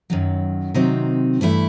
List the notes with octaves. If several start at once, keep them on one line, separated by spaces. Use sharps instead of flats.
F#2 D#3 F#3
C3 D#3 F#3 C4 D#4
G2 E3 A3 E4